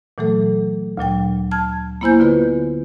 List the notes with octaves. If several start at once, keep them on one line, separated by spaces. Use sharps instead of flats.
A#2 E3 F#3 A3 A4
D2 A#2 F#3 G5
A5 F6 G#6
A#3 B3 E4 C5 G#5 G6
D3 B3 F4 B4